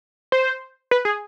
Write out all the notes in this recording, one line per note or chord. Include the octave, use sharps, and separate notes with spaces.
C5
B4
G#4